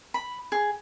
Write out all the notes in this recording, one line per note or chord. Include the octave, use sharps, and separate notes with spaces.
B5
G#4